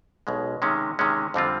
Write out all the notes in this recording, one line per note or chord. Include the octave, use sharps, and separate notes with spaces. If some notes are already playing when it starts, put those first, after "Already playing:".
B1 B2 G#3
C3 D#3 G#3 C#4
C3 D#3 G#3 C#4
F2 D3 G3 C4 F4